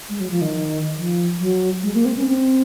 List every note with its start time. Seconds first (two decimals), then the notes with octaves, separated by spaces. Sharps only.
0.09 G#3
0.20 F#3
0.31 F3
0.41 D#3
0.97 F3
1.39 F#3
1.83 G#3
1.94 A#3
2.05 C4
2.17 C#4
2.27 C4